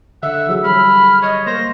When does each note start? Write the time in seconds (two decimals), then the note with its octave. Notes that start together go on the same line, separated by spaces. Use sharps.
0.23 D3 E5 F#5 E6
0.47 E3 F#3 G#4
0.64 F#3 G3 B5 F6
1.22 C#5 D#5
1.46 A#3 C5 A#6